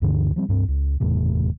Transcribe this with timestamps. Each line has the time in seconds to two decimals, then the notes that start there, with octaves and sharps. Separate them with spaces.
0.02 D2 G2 D3 E3
0.36 F3 G3 C4
0.48 C#2 G2 C4
0.68 C#2
1.00 F#1 E2 A2 C3